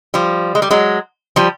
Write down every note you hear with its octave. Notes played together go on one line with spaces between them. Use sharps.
F3 G3
G#3
G3
F#3 G#3
F3 G3